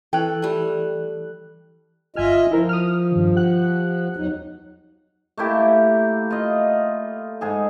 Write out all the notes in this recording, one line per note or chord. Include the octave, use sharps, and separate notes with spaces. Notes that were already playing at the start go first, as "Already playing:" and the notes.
E3 A4 C#5 G5 F#6
G3 A3
G1 F4 D#5 E5 G#5 F6
F3 E4 A#4 C5
D#6 F6
G2 D#3
G4 F#5 F#6
E2 F#3 D#4
A3 A#3 E4 G4
F4 D#5
G#2 G#4 A4